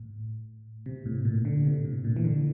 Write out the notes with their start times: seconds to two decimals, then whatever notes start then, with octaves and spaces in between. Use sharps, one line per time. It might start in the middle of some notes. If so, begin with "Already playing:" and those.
Already playing: A2
0.86 C3
1.06 A2
1.25 A#2
1.45 D3
1.65 C3
1.84 A2
2.04 A#2
2.16 E3
2.24 D3